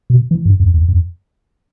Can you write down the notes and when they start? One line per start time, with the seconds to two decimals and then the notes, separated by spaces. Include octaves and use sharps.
0.10 B2
0.31 E3
0.46 G2
0.60 F2
0.74 E2
0.89 F2